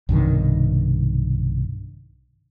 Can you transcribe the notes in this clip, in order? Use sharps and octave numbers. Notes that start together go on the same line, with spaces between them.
B1 G2 C3 D#3